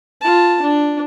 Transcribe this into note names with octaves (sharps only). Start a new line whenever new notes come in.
F4 A5
D4